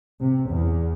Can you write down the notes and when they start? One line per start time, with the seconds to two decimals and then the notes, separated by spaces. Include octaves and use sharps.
0.21 C3
0.50 E2